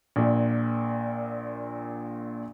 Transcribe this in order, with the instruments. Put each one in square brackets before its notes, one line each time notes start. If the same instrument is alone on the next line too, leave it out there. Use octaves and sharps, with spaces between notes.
[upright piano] A#1 A#2